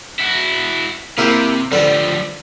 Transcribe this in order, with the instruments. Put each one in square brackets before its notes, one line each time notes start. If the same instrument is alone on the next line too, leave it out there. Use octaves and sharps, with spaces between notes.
[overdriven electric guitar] E4 F#4
[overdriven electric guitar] C3 [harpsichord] A#3 E4 G4
[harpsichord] D3 B4 [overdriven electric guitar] F3 G3